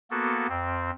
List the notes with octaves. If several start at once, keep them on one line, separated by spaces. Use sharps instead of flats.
A#3 B3 F#4 A4
F2 C4